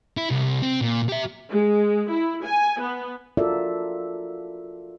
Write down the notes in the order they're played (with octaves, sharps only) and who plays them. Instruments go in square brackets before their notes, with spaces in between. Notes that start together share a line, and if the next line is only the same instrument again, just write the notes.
[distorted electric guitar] E4
C2
C4
A#2
G4 E5
[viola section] G#3
E4
G#5
B3
[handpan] F4 F#4 A4 A#4 D5 E5